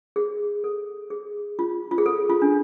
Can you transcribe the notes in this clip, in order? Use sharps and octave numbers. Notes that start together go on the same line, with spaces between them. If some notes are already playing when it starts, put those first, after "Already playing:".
G#4
A4
G#4
F4
F4
G#4
A4
F4
D4